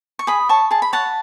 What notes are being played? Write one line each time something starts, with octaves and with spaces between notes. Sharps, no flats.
C#6
G#4 B5 D#6
C#5 A5 C#6
G#4 A5
B5
C#5 F#5 A5